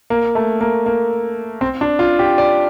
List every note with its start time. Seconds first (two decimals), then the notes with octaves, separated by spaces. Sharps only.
0.10 A#3
0.35 A3
0.61 A#3
0.86 A#3
1.61 C4
1.81 D4
1.99 F4
2.19 G4
2.38 D5